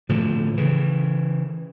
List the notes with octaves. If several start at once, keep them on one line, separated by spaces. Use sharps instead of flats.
A2 D3 F3
C#3 E3